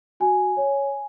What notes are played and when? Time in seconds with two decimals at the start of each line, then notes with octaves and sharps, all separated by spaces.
0.20 F#4 G#5
0.57 C#5